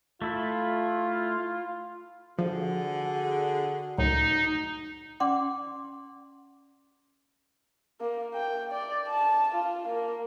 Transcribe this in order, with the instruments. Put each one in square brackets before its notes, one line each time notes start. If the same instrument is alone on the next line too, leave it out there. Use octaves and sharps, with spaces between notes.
[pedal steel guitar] A3 E4 [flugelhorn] F4
[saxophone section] D3 G#4 [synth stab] F3 [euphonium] F#4
[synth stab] C#2 F#2 A2 [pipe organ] D#4
[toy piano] C#4 D5 F#5 C6 D6
[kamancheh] A#3
G5
D5
A5
F4
A#3